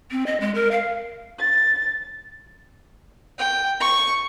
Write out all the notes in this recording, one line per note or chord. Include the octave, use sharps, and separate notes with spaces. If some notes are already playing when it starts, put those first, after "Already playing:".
C4
D#5
G#3
A#4
F5
A6
G5
C#6